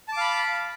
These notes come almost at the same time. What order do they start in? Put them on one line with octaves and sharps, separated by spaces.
A5 D6 F5 B5